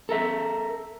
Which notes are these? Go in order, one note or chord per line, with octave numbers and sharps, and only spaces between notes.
A4 A#4 E5